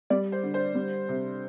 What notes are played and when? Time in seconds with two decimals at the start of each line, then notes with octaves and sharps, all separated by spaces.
0.10 G3 D5
0.32 C5
0.43 D3
0.54 C5
0.75 G3
1.09 C3